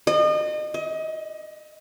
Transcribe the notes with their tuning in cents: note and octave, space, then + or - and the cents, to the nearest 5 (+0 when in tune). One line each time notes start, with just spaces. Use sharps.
D#5 -35
D#5 +30